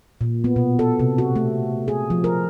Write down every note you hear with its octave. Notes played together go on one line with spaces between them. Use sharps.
A#2
B3
B2
A4
C3
F#4
A3
G#4
F3
A#4